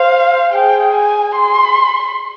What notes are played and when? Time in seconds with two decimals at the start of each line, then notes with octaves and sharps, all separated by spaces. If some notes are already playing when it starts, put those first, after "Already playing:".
Already playing: C5 F5
0.54 G#4 G5
0.95 G#5
1.35 C6